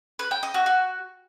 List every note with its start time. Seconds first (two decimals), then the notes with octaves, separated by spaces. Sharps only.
0.19 B4
0.31 G5
0.43 D#5
0.54 F#4
0.66 F#4